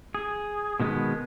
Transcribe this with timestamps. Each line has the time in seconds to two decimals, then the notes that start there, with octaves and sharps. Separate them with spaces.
0.15 G#4
0.80 B2 D#3 G#3 A3 B3